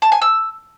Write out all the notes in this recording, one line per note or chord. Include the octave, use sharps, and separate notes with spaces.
A5
G#5
E6